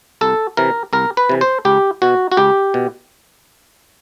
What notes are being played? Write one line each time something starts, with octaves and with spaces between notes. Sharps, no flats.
C2 A4
C3 E3 A#4
C2 A#4
B4
C3 E3
C5
C#2 G4
B2 F#4
F#4
C#2 G4
B2